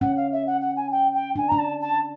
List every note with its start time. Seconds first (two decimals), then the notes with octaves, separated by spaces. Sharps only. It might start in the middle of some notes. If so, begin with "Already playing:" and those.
0.01 C#4 F#5
0.16 F5
0.32 E5
0.46 F#5
0.61 F#5
0.76 G#5
0.91 G5
1.13 G5
1.36 D4 G#5
1.48 D4 A#5
1.58 A5
1.81 A5